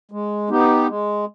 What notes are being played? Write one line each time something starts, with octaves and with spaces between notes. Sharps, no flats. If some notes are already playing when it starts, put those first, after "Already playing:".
G#3
B3 D#4 G4
G#3